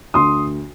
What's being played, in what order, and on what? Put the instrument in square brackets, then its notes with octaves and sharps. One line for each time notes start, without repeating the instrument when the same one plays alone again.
[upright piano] D2 C6 D#6